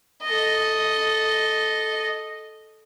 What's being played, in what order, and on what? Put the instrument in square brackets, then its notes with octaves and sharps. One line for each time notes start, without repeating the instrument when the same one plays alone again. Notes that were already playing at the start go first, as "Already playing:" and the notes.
[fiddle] A4 D#5